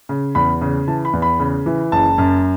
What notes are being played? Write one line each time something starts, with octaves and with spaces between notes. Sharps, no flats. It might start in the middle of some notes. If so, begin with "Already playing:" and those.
C#3
E2 B5
C#3
E3 A5
B5
E2
B5
C#3
E3
F#1 A5
F#2